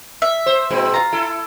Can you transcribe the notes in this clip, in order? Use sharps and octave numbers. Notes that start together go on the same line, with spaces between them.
E5
C5
A#2 G#3 C4 E4
F4 A#5
E4 A4